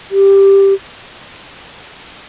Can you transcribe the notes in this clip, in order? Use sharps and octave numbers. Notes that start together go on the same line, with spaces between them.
G4